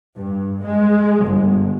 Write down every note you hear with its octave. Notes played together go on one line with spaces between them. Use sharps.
G2
G#3
G1